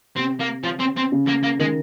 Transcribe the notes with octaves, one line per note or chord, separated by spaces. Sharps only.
C3 C4
A#3
F3
C4
C4
C#3
A#3
A#3
D#3 G#3